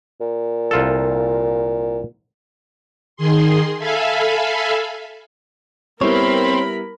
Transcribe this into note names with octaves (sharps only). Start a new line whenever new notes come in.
A#2
C2 F4 A4
D#3 G#4 C6
A4 E5 F5 G#5 B5
G3 B3 C4 E4 A#4 C#5 B5